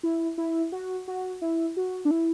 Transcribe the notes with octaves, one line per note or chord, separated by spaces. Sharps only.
E4
E4
F#4
F#4
E4
F#4
D4
E4